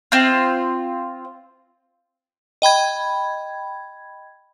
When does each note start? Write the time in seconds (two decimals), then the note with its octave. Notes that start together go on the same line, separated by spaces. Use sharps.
0.12 C4 F4
2.62 D#5 G5 B5 G#6